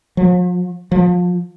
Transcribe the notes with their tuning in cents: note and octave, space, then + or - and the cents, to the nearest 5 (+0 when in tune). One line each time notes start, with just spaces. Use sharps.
F3 +45
F3 +30